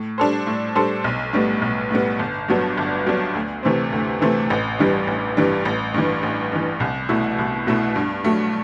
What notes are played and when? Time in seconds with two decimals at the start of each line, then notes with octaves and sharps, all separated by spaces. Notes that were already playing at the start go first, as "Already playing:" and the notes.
Already playing: A2
0.18 G3 D4 A4 C5
0.47 A2
0.75 G3 D4 A4 C5
1.04 B1
1.33 A2 G3 B3
1.62 B1
1.91 A2 G3 B3
2.19 G1
2.48 G2 F#3 B3 D4
2.78 G1
3.06 G2 F#3 B3 D4
3.35 D2
3.63 C3 E3 A3 C4
3.92 D2
4.21 C3 E3 A3 C4
4.50 A1
4.79 G2 E3 G3
5.07 A1
5.37 G2 E3 G3
5.65 A1
5.94 G2 E3
6.23 A1
6.52 G2 E3
6.80 C2
7.09 B2 A3 E4
7.38 C2
7.67 B2 A3 E4
7.96 G2
8.24 F#3 A3